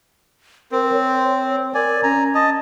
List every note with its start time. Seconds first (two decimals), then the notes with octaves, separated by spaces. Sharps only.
0.72 C4 A#4
0.92 C#5
1.74 A#4 D5 G#5
2.03 C#4 G#5 A#5
2.35 D#5 A5